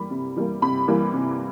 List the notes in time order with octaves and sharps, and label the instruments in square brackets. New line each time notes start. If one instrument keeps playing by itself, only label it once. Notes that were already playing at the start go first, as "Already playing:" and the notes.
Already playing: [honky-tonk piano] E3 G3 A#3 B5
C3
E3 G3 A#3
C3 B5
E3 G3 A#3
C3